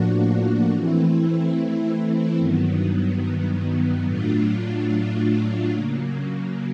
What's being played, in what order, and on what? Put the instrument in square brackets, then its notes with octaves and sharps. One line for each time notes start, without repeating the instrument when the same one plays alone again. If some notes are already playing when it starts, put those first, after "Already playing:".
Already playing: [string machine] A2 F3 A#3 D4 F#4
E3 A3 C4 E4
G2 D#3 F#3 B3
A2 F#3 A3 D4 F4
C#3 F#3 A#3